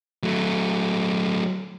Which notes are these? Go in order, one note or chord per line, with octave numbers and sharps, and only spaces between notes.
F#3 A3